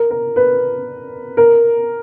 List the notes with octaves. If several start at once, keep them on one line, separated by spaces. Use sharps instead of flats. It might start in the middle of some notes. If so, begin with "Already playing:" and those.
Already playing: A#4
A#4
B4
A#4